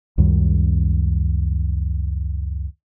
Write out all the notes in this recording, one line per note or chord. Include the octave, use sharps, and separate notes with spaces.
C#2 F#2 D#3 G3